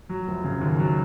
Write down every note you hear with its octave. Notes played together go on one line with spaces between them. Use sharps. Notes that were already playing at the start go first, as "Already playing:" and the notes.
F#3
F1
C#3
D#2
F#3